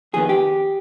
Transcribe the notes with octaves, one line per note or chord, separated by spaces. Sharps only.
F2 D#3 B3 G#4
G4